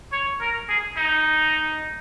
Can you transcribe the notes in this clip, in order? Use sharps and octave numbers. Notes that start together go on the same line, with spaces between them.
C#5
A#4
G#4
D#4